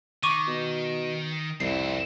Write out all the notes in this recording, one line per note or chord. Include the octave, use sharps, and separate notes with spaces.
D#3 C#6 D6 D#7
B2
C2 F2 E4 C7